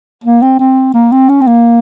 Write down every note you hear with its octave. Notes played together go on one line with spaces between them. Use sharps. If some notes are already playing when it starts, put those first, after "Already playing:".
A#3
C4
C4
A#3
C4
C#4
C4
A#3